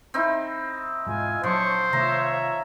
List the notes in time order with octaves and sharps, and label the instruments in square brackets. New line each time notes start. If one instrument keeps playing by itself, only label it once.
[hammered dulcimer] C4 D#4 E4
[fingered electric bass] E1 G#2 G#3 [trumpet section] F4 D#5 G#5
[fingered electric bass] A#2 F#3 [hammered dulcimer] F3 [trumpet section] D4 C#5 C#6 [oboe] C5
[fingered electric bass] C3 D#3 A3 [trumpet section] F4 C#5 E5 [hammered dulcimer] A#5